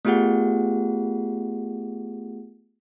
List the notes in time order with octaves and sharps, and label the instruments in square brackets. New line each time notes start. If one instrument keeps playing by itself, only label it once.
[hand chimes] A3 B3 F4 G4 G#4 F#5